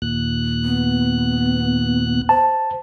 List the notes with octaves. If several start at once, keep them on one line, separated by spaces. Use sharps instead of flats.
D#2 A#2 F#6
B3
C5 A5